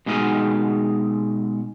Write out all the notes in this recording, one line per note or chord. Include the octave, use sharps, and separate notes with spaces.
B2 G#3 D#4 F#4 F5 G#5